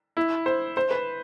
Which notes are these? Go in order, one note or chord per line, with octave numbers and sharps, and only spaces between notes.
E4
C5
C5
B4